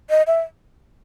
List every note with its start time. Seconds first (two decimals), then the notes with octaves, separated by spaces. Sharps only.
0.10 D#5
0.27 E5